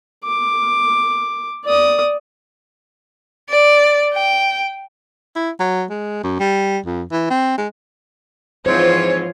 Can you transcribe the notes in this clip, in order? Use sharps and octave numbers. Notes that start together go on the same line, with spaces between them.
D6
D5 D#6
D5
G5
E4
F#3
G#3
F#2
G3
F2
E3
C4
G#3
G#2 E3 F3 C4 F4 C5 C#5